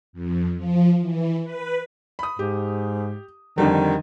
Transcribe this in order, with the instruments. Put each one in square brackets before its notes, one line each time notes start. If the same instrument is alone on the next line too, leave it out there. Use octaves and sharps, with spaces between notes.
[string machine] F2
F3
E3
B4
[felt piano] B5 D#6
[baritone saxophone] G#2 [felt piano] G4
[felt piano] F2 D3 G3 [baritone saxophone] D#3